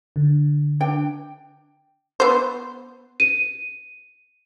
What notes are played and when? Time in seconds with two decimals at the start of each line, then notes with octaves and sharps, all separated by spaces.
0.16 D3
0.80 D4 G5
2.20 B3 C5
3.20 D#7